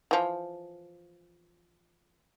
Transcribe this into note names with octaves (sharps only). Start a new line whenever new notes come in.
E3 F3